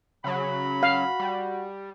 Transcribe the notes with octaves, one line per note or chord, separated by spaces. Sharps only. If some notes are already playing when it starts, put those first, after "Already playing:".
C#3 F#3 B5
F#4 F5
G3